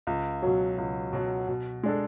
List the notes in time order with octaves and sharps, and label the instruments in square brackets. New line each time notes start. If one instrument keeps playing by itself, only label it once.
[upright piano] C#2
B2 F#3
C#2
B2 F#3
B2
G#3 D4 A4